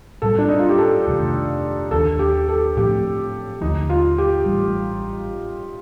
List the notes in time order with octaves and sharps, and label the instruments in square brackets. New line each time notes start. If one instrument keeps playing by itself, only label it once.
[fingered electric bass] A2 G3 C4 [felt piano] A4
[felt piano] D4
D#4
F4
G4
A4
[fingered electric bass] F2 C3 D#3 A3
[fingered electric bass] D#2 D#3 A#3 D4 [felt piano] A4
[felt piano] G4
A4
[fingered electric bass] A2 F3 A3 C4 [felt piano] G4
[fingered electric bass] D#2 D3 F3 A3 [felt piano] D#4
[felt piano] F4
G4
[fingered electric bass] A1 A2 G3